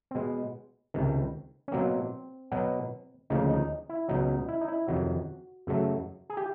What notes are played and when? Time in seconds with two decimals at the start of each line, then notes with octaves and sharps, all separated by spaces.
0.11 C4
0.15 B2 G#3 B3
0.94 C#2 C3 D#3
1.68 C#4
1.72 B2 F#3 A#3 C4
2.52 B2 F#3 B3
3.30 D2 C#3 F3 A#3 D#4
3.50 D#4
3.89 E4
4.09 C#2 B2 F#3 D#4
4.28 D#4
4.49 E4
4.61 D#4
4.68 E4
4.88 F2 C3 D#3 F#3 F#4
5.67 F#2 C#3 F#3 A3
6.30 G#4
6.37 G4